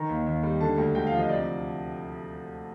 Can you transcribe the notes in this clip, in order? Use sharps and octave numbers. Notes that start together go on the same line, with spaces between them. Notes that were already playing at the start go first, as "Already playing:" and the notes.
Already playing: D#3 A#5
D#2
D#2
G3
D3 A5
D2
D2 G5
F5
F3
D#5
C3 D5